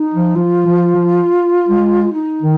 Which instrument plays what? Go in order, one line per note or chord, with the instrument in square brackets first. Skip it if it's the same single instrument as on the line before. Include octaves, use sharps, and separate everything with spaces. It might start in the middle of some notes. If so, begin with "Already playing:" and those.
Already playing: [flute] D#4
[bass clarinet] F3
[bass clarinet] F3 [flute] F4
[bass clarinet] F3
F3
G#3
[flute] D#4
[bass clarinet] D#3